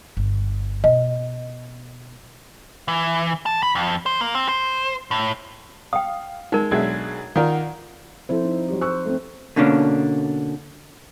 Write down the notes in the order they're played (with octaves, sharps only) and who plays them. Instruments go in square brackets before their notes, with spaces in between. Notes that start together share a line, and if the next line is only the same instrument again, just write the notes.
[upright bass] G1
[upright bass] B2 [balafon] D#5
[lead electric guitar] E3
A5
B5
F2
C5
A#3
C4
C5
A2
[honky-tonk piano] F5 [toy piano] G5 D#6
[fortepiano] G#3 [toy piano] D#4 A#4
[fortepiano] B1 D4 E5 [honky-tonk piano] G#3 G#6
[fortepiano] D#3 A#4 [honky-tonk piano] F4 D5 F#5
[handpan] F3 C4 C5 [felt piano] E4 A4
[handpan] D#4
[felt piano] F#3 G4
[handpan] C5 [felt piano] C#6 E6 F#6
[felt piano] A3 C4
[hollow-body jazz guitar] B2 D3 A#3 C#4 D4